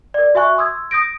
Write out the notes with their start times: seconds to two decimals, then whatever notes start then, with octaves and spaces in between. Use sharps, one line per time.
0.14 A#4 D5
0.35 F#4 E5 G#5 C#6 F#6
0.57 C6 D#6 E6 G#6
0.91 D#6 G6 A#6 D7